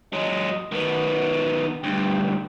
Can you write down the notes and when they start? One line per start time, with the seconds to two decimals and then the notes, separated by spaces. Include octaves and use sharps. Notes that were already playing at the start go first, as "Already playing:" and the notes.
0.13 F#3 G#3 D#5
0.72 D#3 B3 F#4
1.84 D2 G2 G5